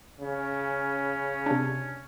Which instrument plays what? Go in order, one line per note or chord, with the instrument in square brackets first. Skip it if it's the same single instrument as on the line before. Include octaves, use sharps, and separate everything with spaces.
[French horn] C#3 [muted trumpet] C#4
[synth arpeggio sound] C3 D4